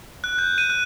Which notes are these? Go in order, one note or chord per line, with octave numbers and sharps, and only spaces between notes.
F#6
G6
D#7
F#6